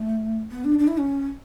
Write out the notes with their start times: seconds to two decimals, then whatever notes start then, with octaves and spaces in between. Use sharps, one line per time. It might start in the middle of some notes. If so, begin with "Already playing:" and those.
Already playing: A3
0.51 B3
0.64 D4
0.79 D4
0.87 E4
0.98 C#4